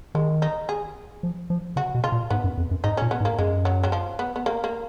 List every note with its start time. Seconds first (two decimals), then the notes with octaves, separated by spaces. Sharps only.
0.15 D#3 G#3
0.42 D#4
0.69 G#4
1.23 F3
1.50 F3
1.76 C#3 F#4
1.95 B2
2.04 F4
2.12 A#2
2.30 G#2 B3
2.44 F#2
2.57 F2
2.71 F#2
2.84 G#2 D#4
2.97 A#2 C#4
3.11 B3
3.21 G#2
3.25 A#3
3.39 F#2 G#3
3.65 F#3
3.83 F#3
3.92 F3
4.19 B3
4.36 B3
4.46 A#3
4.64 A#3